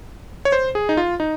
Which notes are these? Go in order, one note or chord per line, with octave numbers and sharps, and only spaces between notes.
C#5
C5
G#4
D#4
F4
D#4